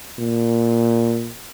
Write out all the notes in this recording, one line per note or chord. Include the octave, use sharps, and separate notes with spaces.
A#2